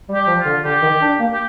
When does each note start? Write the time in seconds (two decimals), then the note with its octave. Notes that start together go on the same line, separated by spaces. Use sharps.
0.09 G3
0.14 G4
0.27 F3
0.40 F4
0.45 D3
0.64 D3 G4
0.82 D#3
1.01 D4
1.20 A#3
1.33 G4